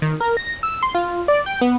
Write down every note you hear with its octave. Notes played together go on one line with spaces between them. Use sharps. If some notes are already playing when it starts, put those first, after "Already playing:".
D#3
A#4
A#6
E6
C6
F4
D5
G5
B3